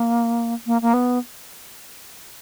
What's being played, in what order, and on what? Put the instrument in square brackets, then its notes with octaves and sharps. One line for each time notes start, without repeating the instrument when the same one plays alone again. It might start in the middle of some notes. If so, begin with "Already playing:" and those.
Already playing: [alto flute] A#3
A#3
A#3
B3